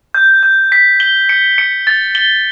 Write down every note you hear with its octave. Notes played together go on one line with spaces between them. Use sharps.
G6
G6
B6
G7
C#7
C#7
A6
G7